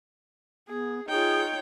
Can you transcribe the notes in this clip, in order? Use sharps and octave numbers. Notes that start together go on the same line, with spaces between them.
B3 G#4
D#4 F4 G#4 C#5 G5